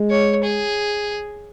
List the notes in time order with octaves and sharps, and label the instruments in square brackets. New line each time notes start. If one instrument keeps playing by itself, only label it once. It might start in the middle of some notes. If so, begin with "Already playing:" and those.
Already playing: [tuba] G#3
[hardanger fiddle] C#5
G#4